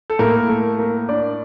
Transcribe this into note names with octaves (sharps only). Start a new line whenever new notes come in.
A4
A2 A#3 A#4
A3 A4
A#3 A#4
D4 D5